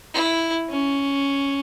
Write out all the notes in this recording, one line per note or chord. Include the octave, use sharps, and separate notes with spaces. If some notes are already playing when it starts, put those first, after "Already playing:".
E4
C#4